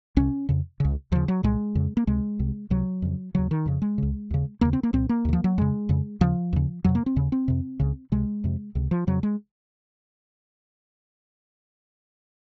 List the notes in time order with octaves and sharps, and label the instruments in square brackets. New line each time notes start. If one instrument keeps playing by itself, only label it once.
[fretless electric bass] C2 C3 C#4
F2 C#3
C#2 C#3
D#2 C#3 F3
F#3
C2 A#2 G#3
F2 C#3
A#3
C#2 C3 G#3
C2 C3
C#2 C3 F#3
F2 C#3
D#2 C#3 F#3
D#3
F2 C#3
G#3
C#2 C#3
D#2 C#3
D#2 C#3 A#3
C4
A#3
C2 A#2 C4
A#3
D#2 C#3
F3
F#3
F2 C#3 G#3
F2 C#3
D#2 C#3 F3
D#2 C#3
F2 C3 F#3
A#3
C4
D#2 C#3
C4
F2 C3
C#2 C#3
C#2 C3 G#3
F2 C3
C#2 C3
F3
F2 C#3 F#3
G#3